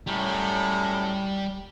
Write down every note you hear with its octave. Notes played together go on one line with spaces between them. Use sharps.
F#2 A2 G3